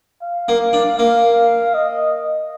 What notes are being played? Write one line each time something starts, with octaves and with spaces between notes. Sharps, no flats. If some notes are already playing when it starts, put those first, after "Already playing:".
F5
A#3
D4
A#3 F5
D#5